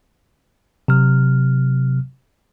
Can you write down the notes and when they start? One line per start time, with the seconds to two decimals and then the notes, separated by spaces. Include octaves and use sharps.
0.88 C3 F#3 F6